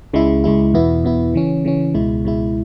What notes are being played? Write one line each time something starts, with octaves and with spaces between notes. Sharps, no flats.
C#2 C#3 G#3 E4
C#2 C#3 G#3 E4
E2 B2 B3 E4
E2 B2 B3 E4
C#3 E3 C#4
C#3 E3 C#4
C#2 B2 G#3 E4
C#2 B2 G#3 E4